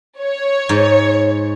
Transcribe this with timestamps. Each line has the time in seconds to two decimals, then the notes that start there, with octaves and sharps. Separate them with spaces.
0.21 C#5
0.69 G#2